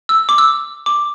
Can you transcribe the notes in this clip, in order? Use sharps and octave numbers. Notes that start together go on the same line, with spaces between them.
E6
D6
E6
D6